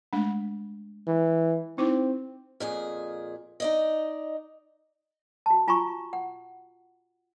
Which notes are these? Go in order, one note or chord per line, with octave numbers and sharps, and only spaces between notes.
G#3 A3 D4
E3
C4 D#4 E4
F2 A#2 G#4
D#4 D5 D#5
F#4 A5
F4 G#5 A#5 B5 C#6
F#5